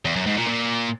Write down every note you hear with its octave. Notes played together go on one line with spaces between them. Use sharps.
E2
F#2
G#2
A#2
A#2